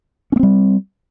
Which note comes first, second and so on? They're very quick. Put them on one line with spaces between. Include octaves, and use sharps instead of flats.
C#4 A#3 C4 G3